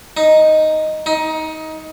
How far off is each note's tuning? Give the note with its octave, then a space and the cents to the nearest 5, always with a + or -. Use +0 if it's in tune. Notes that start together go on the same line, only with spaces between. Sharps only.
D#4 +0
D#4 +20